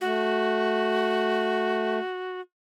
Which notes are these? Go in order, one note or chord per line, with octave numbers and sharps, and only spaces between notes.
A3 F#4